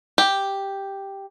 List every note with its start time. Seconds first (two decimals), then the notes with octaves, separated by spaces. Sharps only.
0.18 G4